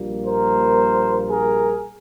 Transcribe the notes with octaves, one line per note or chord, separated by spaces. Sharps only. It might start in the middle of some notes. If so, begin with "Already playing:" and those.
Already playing: A#1 A#2 G3 A#3
A#4 C5
G#4 A#4